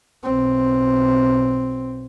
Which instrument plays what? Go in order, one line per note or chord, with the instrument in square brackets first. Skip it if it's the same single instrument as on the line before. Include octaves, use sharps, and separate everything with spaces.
[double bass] B1 C4